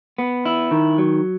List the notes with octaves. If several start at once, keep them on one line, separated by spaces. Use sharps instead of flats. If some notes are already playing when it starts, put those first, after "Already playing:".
B3
E4
D#3
F#3